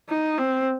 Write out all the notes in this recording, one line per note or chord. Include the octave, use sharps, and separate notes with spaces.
D#4
C4